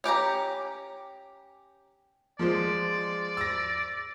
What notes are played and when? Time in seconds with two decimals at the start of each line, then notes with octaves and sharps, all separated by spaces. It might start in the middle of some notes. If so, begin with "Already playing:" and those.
0.04 C#4 G4 G5 A#5
2.39 F3 G#3 C5 D5
3.37 E6 A#6